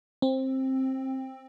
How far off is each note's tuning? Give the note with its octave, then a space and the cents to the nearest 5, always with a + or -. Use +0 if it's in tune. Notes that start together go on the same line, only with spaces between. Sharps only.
C4 +15